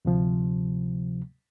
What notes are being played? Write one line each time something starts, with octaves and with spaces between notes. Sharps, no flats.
D2 C3 F3